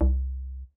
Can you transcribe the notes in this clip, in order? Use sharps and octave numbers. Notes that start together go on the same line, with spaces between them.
C2